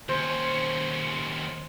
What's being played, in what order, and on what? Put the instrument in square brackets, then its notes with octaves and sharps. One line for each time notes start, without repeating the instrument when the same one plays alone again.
[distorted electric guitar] D#2 C#4 [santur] C5